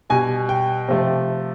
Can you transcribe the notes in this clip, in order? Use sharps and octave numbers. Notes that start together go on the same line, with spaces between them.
B2 G3 G#5
G5
C3 F3 A3